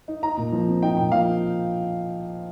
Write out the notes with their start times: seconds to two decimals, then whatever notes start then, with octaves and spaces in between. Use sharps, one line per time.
0.08 D#4
0.23 D#4 A#5
0.37 A#2
0.52 F3
0.68 C4
0.82 D#4 G5
0.97 A#2 G5
1.12 F3 F5